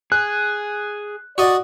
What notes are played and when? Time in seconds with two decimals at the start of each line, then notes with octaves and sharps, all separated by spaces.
0.12 G#4 F#6
1.38 F#4 D5 D#5